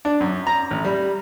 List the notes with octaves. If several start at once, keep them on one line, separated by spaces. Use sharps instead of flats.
D4
F#2
A#5
A1
G3